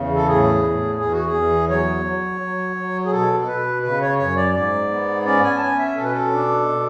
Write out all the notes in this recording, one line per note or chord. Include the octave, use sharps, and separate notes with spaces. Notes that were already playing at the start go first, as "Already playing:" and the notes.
Already playing: E2 C#3
A4
A2 G#4
A2
E2 G#4
F#4
G#4
E2
F#3 C#5
F#3
F#3
F#3
G#4
B2 A4
A4
B2 B4
C#3 B4
C#5
F#2 C#5
D5
G#2 D5
B3
C#4 D5
G#5
A5
C#4 G#5
E5
B2 A4
B4
A4
D4
B2